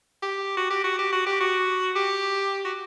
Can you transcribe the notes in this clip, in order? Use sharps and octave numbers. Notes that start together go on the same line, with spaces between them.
G4
F#4
G4
F#4
G4
F#4
G4
F#4
G4
F#4